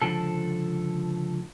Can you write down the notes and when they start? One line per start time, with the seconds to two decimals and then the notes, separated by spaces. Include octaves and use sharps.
0.02 C#2 D3 F3 A4